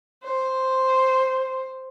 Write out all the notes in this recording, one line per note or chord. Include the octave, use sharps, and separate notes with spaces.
C5